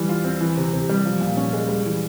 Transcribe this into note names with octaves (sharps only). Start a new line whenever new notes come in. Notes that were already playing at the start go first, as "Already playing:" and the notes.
Already playing: E3 G3
F4
C4
E3
C3
C3
G3
F3
A#2
C#4
G#3
G3
E3